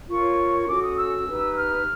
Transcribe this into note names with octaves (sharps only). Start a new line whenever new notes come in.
F4 A#4 C#5 C#6
C#4 F#4 A4 D6
D#6
E6
D#4 G4 B4
F6